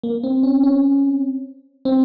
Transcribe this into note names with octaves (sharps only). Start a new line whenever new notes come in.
A#3
C4
C#4
C#4
C4